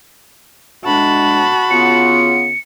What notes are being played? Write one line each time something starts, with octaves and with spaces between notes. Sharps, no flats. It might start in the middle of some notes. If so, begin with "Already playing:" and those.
A2 G#3 D4 F#4 A5 B5
C#3 B3 F4 C#7